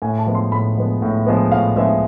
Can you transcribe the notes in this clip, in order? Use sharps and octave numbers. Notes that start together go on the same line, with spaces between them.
A2 G#5
A5
F3 G#3 B3
C6
A2 B5
F3 G#3 B3
A2
F3 G#3 B3
A2 F5
F3 G#3 B3 E5